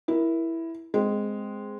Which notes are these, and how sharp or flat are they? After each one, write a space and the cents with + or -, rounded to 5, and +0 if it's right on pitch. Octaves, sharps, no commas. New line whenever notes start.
E4 +0 A#4 +20
G#3 +0 C4 -10